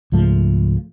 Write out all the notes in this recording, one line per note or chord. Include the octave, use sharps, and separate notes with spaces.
C#2 G#2 F3 A3